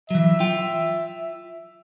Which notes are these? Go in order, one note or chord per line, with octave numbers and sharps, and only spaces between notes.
E3 F#3 E5
F4 G5